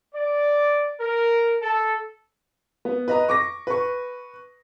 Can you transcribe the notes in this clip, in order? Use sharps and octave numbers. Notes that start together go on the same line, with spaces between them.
D5
A#4
A4
B3
B4 D#5 A#5
C#6 D6 A#6
B4 C#6